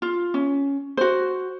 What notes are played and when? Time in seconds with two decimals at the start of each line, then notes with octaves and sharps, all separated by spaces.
0.02 F4
0.34 C#4
0.97 F#4 C5